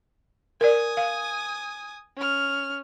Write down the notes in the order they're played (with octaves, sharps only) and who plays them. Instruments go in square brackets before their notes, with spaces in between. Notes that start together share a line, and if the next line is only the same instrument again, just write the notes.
[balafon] A#4 D5 [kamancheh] G#5 D#6
[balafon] F5
[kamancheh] C#4 F6